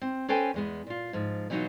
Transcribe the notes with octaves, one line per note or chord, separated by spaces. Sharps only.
C4
C#4 A4 B4 C5 G5 G#5
E2 G#3 B3
A#2 F4
G#2 F3
B2 E3 F#3 D#4 F4 F#4